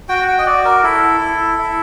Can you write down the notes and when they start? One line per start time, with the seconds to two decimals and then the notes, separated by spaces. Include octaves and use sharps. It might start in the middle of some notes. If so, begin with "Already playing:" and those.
0.09 F#4 G5
0.22 F#5
0.27 G5
0.38 D#5
0.46 F#4 D5
0.65 A#4
0.83 E4 A4
1.21 E4
1.58 E4